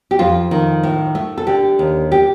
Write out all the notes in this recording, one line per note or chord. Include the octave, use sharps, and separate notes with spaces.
G4
F2 F4
D#3
A2
A3
A4
D3 G4
D#2
G4